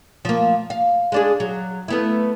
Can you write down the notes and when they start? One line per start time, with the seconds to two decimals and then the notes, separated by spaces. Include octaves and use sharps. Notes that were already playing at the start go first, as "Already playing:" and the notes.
0.25 F3 A#3
0.70 F5
1.12 G#3 D4 G#4
1.40 F#3
1.88 A3 B3 E4